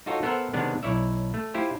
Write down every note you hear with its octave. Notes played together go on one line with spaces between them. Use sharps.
D#4 F4 F#4 A4 C#5
B3 A4 A#4 C5 E5 F#5
C3 D#3 G#3 B3 D4
B1 E4 C#5 D5 E5
A3
E4 F4 G4 C5